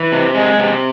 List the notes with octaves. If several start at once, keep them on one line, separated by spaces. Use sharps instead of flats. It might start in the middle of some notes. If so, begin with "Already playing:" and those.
Already playing: E3
C3
G#3
C3